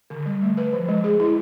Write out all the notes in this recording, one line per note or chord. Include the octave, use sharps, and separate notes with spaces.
D3
G3
A3
B4
F3
G#3
G#4
E4